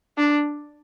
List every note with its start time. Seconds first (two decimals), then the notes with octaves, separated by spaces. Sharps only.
0.18 D4